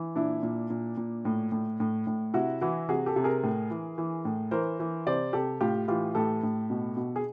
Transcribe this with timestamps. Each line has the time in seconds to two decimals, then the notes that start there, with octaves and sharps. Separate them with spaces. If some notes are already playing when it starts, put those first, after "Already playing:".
Already playing: E3
0.16 A#2 D4 E4
0.43 A#2
0.70 A#2
0.97 A#2
1.25 A2
1.52 A2
1.80 A2
2.07 A2
2.33 C3 E4 F#4
2.61 E3 E4 F#4
2.89 C3 F#4 G#4
3.06 G4 A4
3.16 C3
3.24 G#4 A#4
3.43 A2
3.71 E3
3.98 E3
4.25 A2
4.51 E3 A#4 C5
4.80 E3
5.06 C3 C5 D5
5.33 C3 G4 A4
5.61 A2 F4 G4
5.88 E3 F4 G4
6.15 A2 G4 A4
6.43 A2
6.70 B2
6.97 B2
7.16 G#4